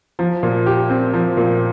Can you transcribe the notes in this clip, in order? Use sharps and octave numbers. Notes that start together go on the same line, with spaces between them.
F3
A#2
G4
C4
F3
A#2